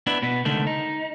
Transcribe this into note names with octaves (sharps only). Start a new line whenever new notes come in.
B3 D4 E4
B2 B3
C#2 D3 D#3 A3 A4
D#4